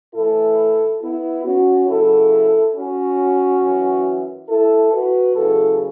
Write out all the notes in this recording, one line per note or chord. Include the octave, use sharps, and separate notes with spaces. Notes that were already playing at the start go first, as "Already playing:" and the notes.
A2 E3 E4 A4
B3 E4
C#4 F#4
F#2 C#3 F#3 E4 A4
C#4 F#4
F#2 E3
E4 A4
F#4 B4
E2 C#3 F#3 E4 A4